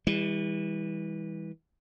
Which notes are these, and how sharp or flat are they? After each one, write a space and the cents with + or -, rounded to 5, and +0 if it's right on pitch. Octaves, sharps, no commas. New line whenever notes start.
E3 -20 G3 +40